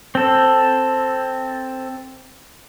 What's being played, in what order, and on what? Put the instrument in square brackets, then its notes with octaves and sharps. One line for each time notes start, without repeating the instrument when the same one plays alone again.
[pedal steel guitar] C4 A4